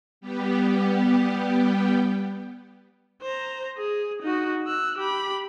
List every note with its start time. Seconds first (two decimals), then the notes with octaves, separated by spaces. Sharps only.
0.21 G3 B3 G4
3.23 C5 A#5
3.78 G#4
4.22 D#4 F#4
4.67 E6 F#6
4.98 G4 B5